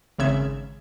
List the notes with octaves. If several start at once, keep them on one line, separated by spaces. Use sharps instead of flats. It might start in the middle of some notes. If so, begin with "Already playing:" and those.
G#1 C#3 E5 G#6